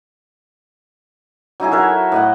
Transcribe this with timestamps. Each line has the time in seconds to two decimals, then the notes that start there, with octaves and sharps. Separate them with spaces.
1.60 F#3 D#4 E4 G#4
1.71 F#4 A4 A#4 E5
2.12 A2 D#5 F#5